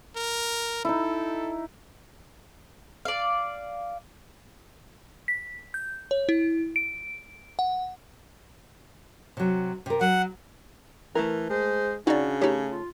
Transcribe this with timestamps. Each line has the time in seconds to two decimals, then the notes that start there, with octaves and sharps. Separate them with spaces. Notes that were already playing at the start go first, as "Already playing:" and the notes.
0.16 A#4
0.85 D#4 E4 A4
3.05 D5 F5
5.28 B6
5.74 G6
6.11 C#5
6.29 E4
6.76 D7
7.59 F#5
9.37 C3 F#3
9.86 C3 A#4
10.01 F#3 F#5
11.15 E3 A3 A#4
11.50 G#3 C5
12.07 C#3 D4 D#4 F#4 D5
12.41 A3 D#4 G4 C#5
12.70 F4